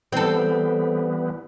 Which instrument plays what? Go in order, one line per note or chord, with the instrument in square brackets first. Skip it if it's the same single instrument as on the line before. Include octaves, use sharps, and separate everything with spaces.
[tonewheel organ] E3 G3 B3 [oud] C4 A4